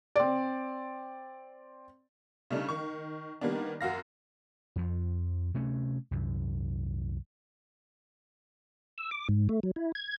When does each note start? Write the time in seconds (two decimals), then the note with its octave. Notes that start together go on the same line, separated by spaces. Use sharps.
0.16 C4 D5
2.51 C#3 G3 A3 D4 D#4
2.69 D#3 C#6
3.41 D#3 G3 A#3 B3 D4
3.81 F#2 F#4 F5 A#6
4.76 F2 F3
5.54 C3 A3 C#4
6.11 C2 F#2
8.98 E6
9.11 D6
9.29 G#2
9.49 A3
9.63 F#3
9.76 E4
9.95 G#6